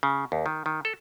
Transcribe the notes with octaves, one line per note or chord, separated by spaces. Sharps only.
C#3
D#2
D#3
D#3
A4